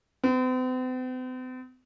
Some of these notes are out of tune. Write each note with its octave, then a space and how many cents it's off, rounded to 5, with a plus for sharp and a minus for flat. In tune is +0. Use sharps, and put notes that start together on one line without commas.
C4 -45